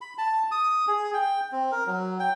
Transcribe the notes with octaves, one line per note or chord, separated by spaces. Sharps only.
B5
A5
D#6
G#4
G5
C4
A#4
F#3
G5